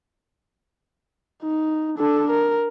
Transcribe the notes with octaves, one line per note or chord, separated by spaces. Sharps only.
D#4
D4 A4
A#4